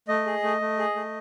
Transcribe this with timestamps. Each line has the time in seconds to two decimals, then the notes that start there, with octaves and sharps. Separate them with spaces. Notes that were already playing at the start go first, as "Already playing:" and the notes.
0.08 A3 D#5
0.26 G#4
0.43 A3
0.61 A3
0.78 G#4
0.96 A3